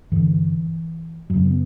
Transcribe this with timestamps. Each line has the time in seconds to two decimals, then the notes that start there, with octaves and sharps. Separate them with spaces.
0.12 G2 D3 E3
1.30 F#2 C#3 F#3
1.45 B3